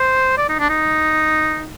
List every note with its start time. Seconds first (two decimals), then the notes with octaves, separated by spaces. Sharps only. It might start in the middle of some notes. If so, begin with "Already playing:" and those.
Already playing: C5
0.38 D5
0.49 D#4
0.59 D4
0.69 D#4